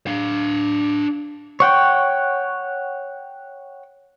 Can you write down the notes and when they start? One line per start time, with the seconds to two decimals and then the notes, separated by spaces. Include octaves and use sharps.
0.07 D4 F5
1.60 C#5 F#5 G5